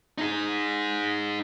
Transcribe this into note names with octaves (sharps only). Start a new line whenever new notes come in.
D#4 G#4